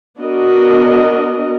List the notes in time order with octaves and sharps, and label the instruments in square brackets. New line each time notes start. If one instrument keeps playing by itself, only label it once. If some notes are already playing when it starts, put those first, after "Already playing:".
[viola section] B3 D4 F#4 A#4 D#5